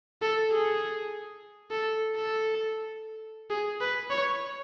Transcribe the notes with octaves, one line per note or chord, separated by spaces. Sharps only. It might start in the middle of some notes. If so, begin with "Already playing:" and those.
A4
G#4
A4
A4
G#4
B4
C#5